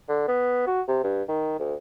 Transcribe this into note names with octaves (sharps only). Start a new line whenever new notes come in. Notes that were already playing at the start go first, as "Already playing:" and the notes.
D3
B3
F#4
C3
G2
D#3
D2